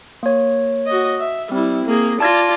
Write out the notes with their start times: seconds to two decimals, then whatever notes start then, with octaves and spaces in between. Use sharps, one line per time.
0.23 A#3 C#5
0.86 F#4 D#5
1.20 E5
1.52 G3 C4 E4
1.86 A#3 G#4
2.20 F4 D5 A5 G#6 A#6